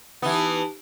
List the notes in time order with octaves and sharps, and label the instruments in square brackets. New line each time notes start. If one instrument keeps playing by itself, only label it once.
[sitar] E3 B3 [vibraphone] D#4 G4 A5